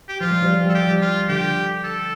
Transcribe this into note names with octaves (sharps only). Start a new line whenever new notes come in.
G4
F3 F4
G3
F3
G3
F3 A4
G3 G4
F3
F4
D3 G4
A4